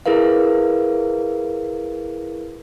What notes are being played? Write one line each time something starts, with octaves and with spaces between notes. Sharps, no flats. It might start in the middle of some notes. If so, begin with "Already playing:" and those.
E4 G#4 A#4 B4 F5